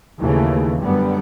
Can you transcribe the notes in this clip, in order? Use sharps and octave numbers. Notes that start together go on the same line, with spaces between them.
D#2 C#3 E3 A3
F#2 D3 G3 B3